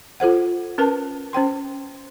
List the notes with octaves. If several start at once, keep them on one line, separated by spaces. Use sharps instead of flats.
F4 A4 C5 F#5
C#4 A#4 B4 A5
C#4 C5 G5 C6